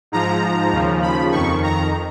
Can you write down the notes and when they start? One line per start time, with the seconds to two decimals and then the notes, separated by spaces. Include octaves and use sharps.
0.12 G#2 F3 A#5
0.72 D#2 C#3 F3
1.02 B5
1.32 F2 D#3 C#6
1.63 A#5